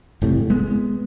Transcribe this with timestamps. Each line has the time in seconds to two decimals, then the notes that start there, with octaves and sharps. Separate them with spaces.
0.22 F#1 A2 C3
0.50 G#3 B3